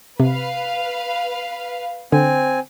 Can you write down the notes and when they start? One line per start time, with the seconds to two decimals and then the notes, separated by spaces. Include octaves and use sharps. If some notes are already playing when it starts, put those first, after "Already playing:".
0.20 C3 B4 F5
2.12 D3 C4 G#5